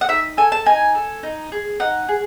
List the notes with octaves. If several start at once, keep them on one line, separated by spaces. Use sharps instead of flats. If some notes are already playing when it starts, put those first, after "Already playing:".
F#5
D#4 E5
A4 G#5
A5
D#4 G#5
A4
D#4
G#4
D#4 F#5
G#4